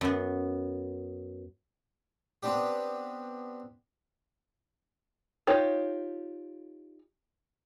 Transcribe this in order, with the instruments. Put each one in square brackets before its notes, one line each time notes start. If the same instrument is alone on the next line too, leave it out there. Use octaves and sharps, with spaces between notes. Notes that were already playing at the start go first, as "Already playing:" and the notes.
[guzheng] F#2 B3
[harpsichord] B3 C4 D4 G4
[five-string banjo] D#4 F4 G4 C#5